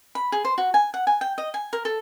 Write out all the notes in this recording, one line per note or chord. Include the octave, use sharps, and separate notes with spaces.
B5
G#4
C5
F#4
G#5
F#5
G#5
G5
D#5
G#5
A#4
A4